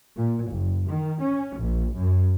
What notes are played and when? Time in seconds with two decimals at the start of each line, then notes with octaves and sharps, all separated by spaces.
0.16 A#2
0.51 F#1
0.86 D#3
1.21 C#4
1.59 A#1
1.94 F#2